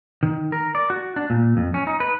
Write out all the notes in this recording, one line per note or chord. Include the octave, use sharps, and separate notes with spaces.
D#3
A#4
D5
F#4
D4
A#2
F2
C#4
D#4
B4